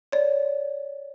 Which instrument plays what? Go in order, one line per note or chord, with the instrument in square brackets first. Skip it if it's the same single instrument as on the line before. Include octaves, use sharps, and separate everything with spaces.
[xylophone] C#5 D5